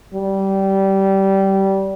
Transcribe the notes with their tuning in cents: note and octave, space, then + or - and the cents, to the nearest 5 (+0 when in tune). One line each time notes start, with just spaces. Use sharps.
G3 -20